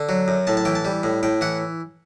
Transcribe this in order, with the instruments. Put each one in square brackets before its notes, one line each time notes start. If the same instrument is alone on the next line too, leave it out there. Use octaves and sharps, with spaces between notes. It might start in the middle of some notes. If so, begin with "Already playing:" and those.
Already playing: [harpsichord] D3
F#3
F#2
A2 A5
A5
E3 G5
A5
G3
A2
A2 G5
E3 F#5